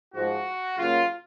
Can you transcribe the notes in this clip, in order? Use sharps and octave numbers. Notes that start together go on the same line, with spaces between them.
G#2 F3 G#3 F#4
C#3 F#3 A#3 F4